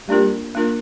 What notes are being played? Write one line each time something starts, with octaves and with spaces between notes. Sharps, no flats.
G3 A#3 D4 F4 A#4
A#3 D4 F4 A#4